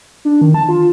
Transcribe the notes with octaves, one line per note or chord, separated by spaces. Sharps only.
D4
D#3
A5
F4